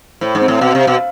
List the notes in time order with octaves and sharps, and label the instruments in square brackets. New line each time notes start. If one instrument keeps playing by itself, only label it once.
[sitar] A2 [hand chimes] C5
[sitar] G#2
[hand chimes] C4
[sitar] A2
[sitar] B2 [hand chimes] F5
[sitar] C3
[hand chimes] F5
[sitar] B2